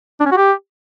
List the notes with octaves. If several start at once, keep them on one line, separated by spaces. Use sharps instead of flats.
D4
C#4
F#4
G4